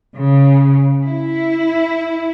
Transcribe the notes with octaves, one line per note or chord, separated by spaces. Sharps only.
C#3
E4